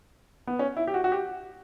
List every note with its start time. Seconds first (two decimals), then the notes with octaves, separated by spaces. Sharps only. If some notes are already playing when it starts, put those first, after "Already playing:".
0.47 B3
0.59 C#4
0.77 E4
0.87 G4
0.94 F#4
1.04 F#4
1.12 G4